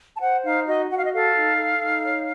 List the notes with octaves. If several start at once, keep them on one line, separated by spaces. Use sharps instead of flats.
A5
C5 F#5
D#4 F5
F#4 D#5
F#4 F#5
F5
D#5
A4 F5
D#4
A4
D#4
C#5